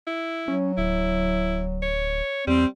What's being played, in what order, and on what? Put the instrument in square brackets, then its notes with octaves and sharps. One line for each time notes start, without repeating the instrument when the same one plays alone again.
[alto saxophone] E4
[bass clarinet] F#3 [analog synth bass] C#4
[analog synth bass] D1 [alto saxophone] E4
[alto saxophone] C#5
[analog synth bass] E2 [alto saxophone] G3 [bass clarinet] C4